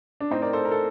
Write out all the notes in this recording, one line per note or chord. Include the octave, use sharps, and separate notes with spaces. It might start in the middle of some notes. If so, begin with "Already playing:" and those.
D4
A2 C4 D#4
A#4 D5
A4 C5
A#4
A4